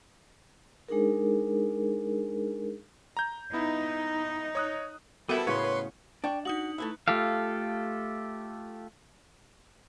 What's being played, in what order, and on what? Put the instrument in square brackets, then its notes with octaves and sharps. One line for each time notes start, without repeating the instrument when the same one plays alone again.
[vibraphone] G#3 D4 D#4 G#4 A#4
[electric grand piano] A#5 G6
[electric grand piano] B3 E4 [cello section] D#4
[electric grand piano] C#5 D#6 F#6
[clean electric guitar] G3 E4 [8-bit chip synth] B3 A4 [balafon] F#4 A#4 E5
[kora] A2 C#3 B3 [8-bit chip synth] B4 C6 [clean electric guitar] C#5
[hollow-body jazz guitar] D4 [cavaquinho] D5 G5 C#6
[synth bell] D#4 D#6 F#7 [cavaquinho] F#4
[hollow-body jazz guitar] A3 E4 E5 [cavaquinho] B4 A#5
[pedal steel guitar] A3 F4 G4 A4 F5